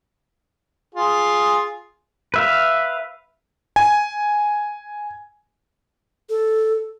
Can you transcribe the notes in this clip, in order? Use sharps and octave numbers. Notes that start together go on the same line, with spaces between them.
F4 G#4
B4 E5 F5
G#5
A4